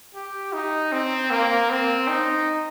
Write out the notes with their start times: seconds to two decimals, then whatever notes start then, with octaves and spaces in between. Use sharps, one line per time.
0.15 G4
0.53 D#4
0.92 C4
1.31 A#3
1.70 C4
2.08 D#4